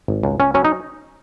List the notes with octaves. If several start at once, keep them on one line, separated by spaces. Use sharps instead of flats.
G#1
C#2
C#2 C#4
F#3 C#4
D#4